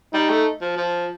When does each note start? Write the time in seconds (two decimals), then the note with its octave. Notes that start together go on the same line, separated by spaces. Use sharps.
0.13 G3 D#4
0.30 A3
0.61 F3
0.77 F3